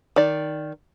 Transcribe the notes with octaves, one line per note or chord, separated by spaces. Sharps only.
D#3 D5